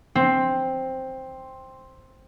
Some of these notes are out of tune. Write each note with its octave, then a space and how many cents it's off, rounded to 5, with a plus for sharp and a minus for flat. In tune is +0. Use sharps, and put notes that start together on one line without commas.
C4 +5